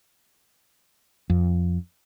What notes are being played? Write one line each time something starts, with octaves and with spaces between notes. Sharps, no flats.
F2